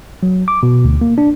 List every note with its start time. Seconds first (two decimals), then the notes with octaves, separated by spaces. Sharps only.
0.23 F#3
0.48 D6
0.63 B2
0.85 D2
1.01 A#3
1.18 D4